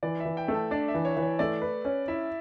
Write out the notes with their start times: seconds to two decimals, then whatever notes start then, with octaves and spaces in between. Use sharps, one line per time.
0.03 E3 D5
0.20 E5
0.25 E3
0.37 G5
0.48 A3
0.54 A5
0.71 D4 D5
0.88 E5
0.94 E3
1.05 C#5
1.17 E3
1.22 C#5
1.39 A3 D5
1.62 B4
1.85 C#4
2.08 E4 E5